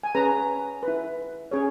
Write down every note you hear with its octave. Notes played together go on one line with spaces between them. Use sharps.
G#5
C#4 G#4 B4 A#5
E4 B4
C#4 G#4 C#5